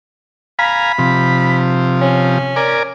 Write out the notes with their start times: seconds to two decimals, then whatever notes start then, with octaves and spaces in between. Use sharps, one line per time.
0.59 F5 G#5 A#5 B5
0.98 C3 F3
2.02 C#4
2.56 A#4 D5 G#5